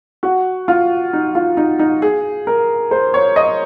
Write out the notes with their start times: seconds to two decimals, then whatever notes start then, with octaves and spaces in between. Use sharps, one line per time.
0.23 F#4
0.68 F4
1.13 D#4
1.35 F4
1.57 D#4
1.79 D#4
2.02 G#4
2.47 A#4
2.91 C5
3.14 C#5
3.36 D#5